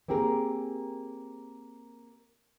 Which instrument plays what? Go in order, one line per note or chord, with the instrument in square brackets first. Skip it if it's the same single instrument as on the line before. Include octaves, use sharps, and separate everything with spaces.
[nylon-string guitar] A#3 C4 G4 G#4 A#4